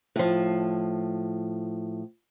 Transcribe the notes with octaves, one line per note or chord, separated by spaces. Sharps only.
A2 F3